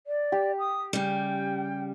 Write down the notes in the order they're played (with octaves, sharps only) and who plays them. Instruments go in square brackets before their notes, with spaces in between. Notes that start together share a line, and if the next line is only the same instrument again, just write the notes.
[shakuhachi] D5
[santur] G4
[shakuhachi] D#6
[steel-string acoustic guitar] C#3 G3 [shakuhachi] G5